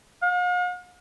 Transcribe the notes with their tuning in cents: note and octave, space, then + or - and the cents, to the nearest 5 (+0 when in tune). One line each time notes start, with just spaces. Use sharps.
F5 +45